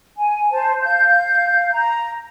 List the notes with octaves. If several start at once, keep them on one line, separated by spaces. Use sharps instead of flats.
G#5
C5 A5
F5 G6
A#5